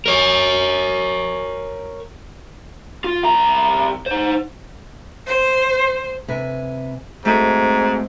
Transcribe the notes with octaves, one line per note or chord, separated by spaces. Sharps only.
A#4 C#5
F4
C2 A#5
D#4 C5
C5
C3 B4 G#5
G#2 A3 C4 F#4